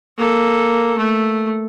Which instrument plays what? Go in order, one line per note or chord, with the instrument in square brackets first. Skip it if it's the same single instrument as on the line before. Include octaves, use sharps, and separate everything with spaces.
[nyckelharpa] A#3 A4
A3